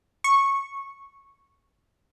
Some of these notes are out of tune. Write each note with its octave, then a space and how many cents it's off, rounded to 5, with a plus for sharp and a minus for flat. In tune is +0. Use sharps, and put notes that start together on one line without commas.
C#6 -10